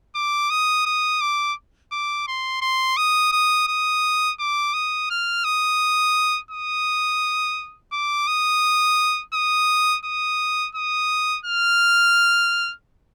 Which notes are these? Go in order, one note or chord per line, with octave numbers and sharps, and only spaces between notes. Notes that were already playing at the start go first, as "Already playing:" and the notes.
D6
D#6
D#6
D6
D6
C6
C6
D#6
D#6
D#6
D6
D#6
F6
D#6
D#6
D6
D#6
D#6
D#6
D#6
F6